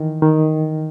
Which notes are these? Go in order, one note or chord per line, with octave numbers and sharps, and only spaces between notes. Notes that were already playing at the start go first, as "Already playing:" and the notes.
Already playing: D#3 E3
D#3